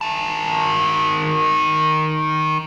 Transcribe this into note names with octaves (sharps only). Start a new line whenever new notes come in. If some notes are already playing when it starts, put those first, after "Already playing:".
D#3 A5